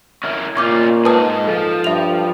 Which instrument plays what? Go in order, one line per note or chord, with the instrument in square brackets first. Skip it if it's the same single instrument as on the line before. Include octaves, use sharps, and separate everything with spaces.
[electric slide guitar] C#4 E4 A#4
[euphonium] A#2 [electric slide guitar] C#4 F4 [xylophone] C#6 D6 G6
[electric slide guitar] G#2 G#4 [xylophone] B4 A5 D#6
[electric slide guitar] F3 [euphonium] A4
[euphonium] G2 [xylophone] E5 F7